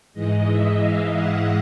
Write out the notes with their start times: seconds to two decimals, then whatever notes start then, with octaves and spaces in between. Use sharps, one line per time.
0.14 G#2 E3 G#3 D#5
0.46 E5
0.78 F5
1.09 F#5